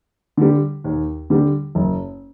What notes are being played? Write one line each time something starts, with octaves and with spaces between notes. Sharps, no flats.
D3 G3
D#2
D3 G3
F#1